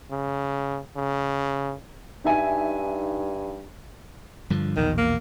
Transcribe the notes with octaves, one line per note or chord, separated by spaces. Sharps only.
C#3
C#3
G2 D#4 E5 G#5
G2 D3 F3
A#1 E2 B2 D#3
A#3